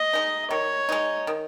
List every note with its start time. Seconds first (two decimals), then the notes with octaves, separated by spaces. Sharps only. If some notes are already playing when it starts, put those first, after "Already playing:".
Already playing: D#5
0.13 G#3 D#4
0.51 D#3 C#5
0.89 G#3 D#4
1.27 D#3